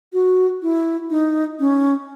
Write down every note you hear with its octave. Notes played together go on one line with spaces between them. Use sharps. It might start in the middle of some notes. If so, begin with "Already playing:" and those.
F#4
E4
D#4
C#4